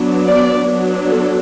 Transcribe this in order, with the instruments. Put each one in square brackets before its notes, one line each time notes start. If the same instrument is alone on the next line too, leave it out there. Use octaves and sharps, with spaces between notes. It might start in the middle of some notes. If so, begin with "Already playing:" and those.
Already playing: [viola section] F#3 B3 D4
D5
F#3 B3 D4
A4